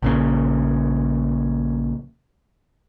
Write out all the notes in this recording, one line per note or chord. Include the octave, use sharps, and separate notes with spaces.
A#1 A#2 C#3